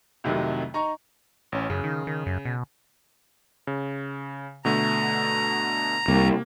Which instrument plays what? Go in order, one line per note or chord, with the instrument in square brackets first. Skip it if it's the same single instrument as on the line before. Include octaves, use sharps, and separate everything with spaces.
[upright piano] C2 F2 C3 D#3 F#3 A3
D#4 A#5 C#6
[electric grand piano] A1 C#4
[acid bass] F#2 [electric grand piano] C#3
[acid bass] D#3
D#3
F#2
B2
[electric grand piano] C#3
[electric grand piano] B2 D3 A3 [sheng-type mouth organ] A#5
[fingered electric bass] C2 [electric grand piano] A#3